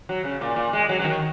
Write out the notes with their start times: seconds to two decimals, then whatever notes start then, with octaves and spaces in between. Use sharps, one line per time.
0.09 F#3
0.24 C#3
0.41 A#2
0.56 A#2
0.73 G#3
0.89 F#3
0.99 F#3
1.04 D#3